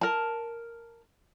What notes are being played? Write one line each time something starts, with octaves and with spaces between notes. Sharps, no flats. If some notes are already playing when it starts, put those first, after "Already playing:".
A#4 A5